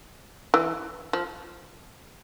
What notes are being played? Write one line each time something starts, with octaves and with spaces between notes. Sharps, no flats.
E3
F3